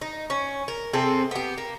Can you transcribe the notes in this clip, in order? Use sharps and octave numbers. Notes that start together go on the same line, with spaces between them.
D#4
C#4
A#4
C3 C4 G#4 A4
B3 G4
A#3